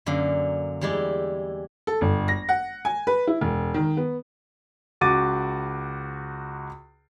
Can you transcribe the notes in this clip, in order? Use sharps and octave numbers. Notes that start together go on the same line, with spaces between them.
F#2 D3 A#3
E2 G3 G#3 E4 G4
A4
G1
A#6
F#5
G#5
B4
E4
E1
D#3
B3
C#2 F#4 D6 A6 D#7